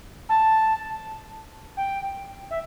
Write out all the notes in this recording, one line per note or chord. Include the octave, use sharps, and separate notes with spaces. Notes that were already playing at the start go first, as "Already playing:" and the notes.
A5
G5
E5